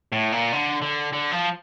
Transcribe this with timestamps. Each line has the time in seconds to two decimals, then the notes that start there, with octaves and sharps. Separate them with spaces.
0.12 A2
0.33 A#2
0.53 D3
0.82 D3
1.13 D3
1.32 F3